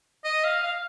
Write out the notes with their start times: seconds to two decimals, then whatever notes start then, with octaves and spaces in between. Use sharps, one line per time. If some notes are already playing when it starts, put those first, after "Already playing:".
0.25 D#5
0.44 F5
0.63 F5